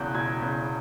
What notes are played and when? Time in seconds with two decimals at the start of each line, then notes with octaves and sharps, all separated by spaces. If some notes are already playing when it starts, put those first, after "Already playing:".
Already playing: E1 E2 C#3 F#6 G6
0.15 E1 G#6
0.42 E2 C#3 G6